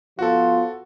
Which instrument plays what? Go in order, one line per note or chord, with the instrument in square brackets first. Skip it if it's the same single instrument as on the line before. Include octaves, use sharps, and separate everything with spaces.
[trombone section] F3 B3 F4 [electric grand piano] F#4 A4